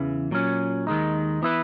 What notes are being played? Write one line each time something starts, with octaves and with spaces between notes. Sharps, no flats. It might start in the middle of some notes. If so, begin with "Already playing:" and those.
Already playing: E2 C#3 E3
A#2 F#3 C#4
D#2 D#3 G#3 D#4
E3 B3 E4 B4